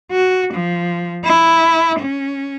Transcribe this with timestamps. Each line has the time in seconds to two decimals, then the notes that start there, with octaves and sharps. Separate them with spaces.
0.11 F#4
0.53 F3
1.25 E4
1.99 C#4